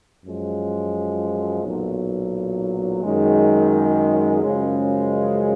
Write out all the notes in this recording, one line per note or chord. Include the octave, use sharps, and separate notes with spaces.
F#2 F3 G#3
B1 A#2 F#3
F#2 D#3 G#3
F#2 C#3 F3 G#3